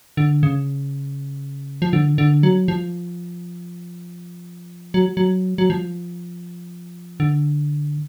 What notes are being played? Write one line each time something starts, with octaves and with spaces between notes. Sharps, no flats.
D3
C#3
F3
D3
D3
F#3
F3
F#3
F#3
F#3
F3
D3